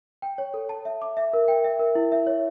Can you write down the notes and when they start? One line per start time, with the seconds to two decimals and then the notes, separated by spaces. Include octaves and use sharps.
0.22 G5
0.38 C#5
0.54 A4
0.69 A5
0.85 E5
1.02 D6
1.17 E5
1.33 A#4
1.48 G5
1.64 E5
1.79 A#4
1.95 E4
2.12 E5
2.27 C#5